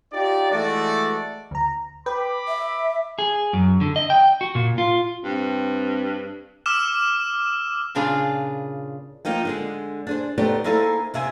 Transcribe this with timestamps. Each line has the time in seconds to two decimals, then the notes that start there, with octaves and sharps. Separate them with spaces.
0.13 D#4 F4 G4 D5
0.51 E3 G#3 A3 F#4 D5
1.51 D2 A#5
2.06 B4 G5 B5 D6
2.48 E5
3.19 G#4
3.53 F#2
3.81 D3
3.96 D#5
4.10 G5
4.41 F#4
4.55 A#2
4.78 F4
5.24 G2 C4
6.66 D6 E6 F6 E7
7.95 A#2 C#3 D4 F4 G#4 F5
9.25 F3 A#3 D#4 G5
9.45 D3 G#3 G#4
10.07 D4 G#4 C5
10.38 A3 B3 D#4 G4 C5 D5
10.64 A#3 D#4 E4 G#4 A4 C5
11.14 D#2 C3 E5 G#5